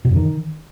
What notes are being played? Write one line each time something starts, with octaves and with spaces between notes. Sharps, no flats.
B2
F#2
D#3